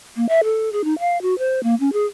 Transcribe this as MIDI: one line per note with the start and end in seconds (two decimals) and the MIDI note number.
0.16 0.26 58
0.29 0.41 76
0.44 0.72 69
0.72 0.82 68
0.84 0.98 63
0.99 1.20 77
1.22 1.37 66
1.38 1.63 72
1.63 1.75 58
1.80 1.92 61
1.93 2.06 68